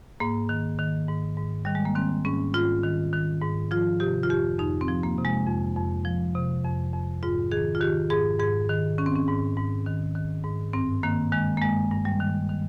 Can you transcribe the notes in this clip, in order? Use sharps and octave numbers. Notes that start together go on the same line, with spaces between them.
G#2 A#3
D#3
D#3
G#2
G#2
D#3 G3
G#3
A#3
D#3 C4
G#2 C#4
G#2 F4
D#3
D#3
G#2
F3 F4
C3 G4
F4
F2 G4
F2 D#4
C4
F3
A#3
C3
G#3
F2
F2
F3
C3
F2
F2
G#2 F4
D#3 G#4
F4
D#3 G4
G#2 G#4
G#2 G#4
D#3
D#3 C#4
C4
C#4
G#2
G#2
D#3
D#3
G#2
G2 C4
D#3 A#3
D#3 G#3
A#3
G2 G#3
G2
G3
D#3
D#3